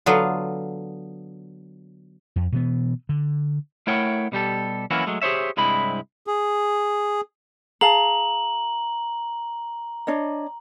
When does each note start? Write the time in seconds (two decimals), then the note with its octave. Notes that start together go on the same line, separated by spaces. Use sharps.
0.06 D3 F#3 B3 F4
2.36 F2
2.52 B2 E3 B3
3.09 D3
3.87 A3 E4 A#4 C#5 F#5 G5
4.32 B2 G3 G4 A4
4.91 E3 F#3 A#3 C#4 E4 F#4
5.07 F#3 G#3 A3
5.22 G4 G#4 C5 C#5 E5
5.57 C2 G2 G#3 C4 E4 B5
6.27 G#4
7.81 G#4 F5 A5 A#5 F#7
10.07 D4 C#5 D#5